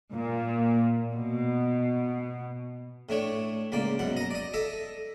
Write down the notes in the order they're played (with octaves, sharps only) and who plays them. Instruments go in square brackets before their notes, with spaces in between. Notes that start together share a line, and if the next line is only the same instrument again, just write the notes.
[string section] A#2
B2
[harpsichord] A2 A3 D4 C#5
C#2 A#3 D5
F#2 B2 F#5
D#5 A#5
D5 D#5
A4 D#5 E5